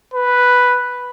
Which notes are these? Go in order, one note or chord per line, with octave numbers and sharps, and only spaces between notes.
B4